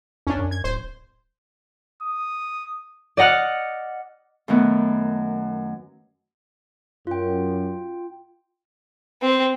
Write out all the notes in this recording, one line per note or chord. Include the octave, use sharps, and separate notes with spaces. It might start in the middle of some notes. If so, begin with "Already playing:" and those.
F2 C#4 D4
F#2
G#6
D1 C5
D#6
D5 D#5 F#5 F6 F#6
F#2 D#3 A3 B3
F#2 F4 G5
C4